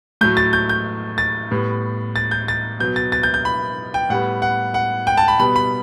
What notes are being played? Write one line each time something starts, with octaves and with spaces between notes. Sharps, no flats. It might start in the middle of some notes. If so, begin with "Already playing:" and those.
A2 F#3 A3 G6
A6
G6
G6
A6
A2 G3 B3
A6
G6
A6
B2 F#3 B3 G6
A6
A6
G6
G6
B5
G5
A2 G3 B3 F#5
F#5
F#5
G5
A5
B5
B2 G3 B3 B5
B5